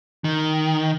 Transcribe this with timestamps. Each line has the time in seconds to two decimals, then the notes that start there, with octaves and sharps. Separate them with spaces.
0.24 D#3